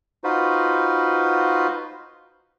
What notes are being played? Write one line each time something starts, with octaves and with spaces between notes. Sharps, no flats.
D#4 F4 F#4 B4 C5